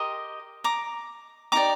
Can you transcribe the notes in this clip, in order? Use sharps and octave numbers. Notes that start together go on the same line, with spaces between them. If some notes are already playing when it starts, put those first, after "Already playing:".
Already playing: G4 A#4 D#5 C6 D#6
A#5 D6
D#4 G4 D5 A#5 D6